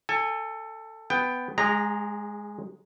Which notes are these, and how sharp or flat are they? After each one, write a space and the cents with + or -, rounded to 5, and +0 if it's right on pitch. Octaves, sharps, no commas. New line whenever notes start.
A4 +15 G#5 -20
B3 +15 G5 +10
G#3 +0 G#4 -40 A#5 -5